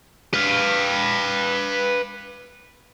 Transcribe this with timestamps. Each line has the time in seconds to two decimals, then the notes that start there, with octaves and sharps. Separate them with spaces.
0.34 B4 F5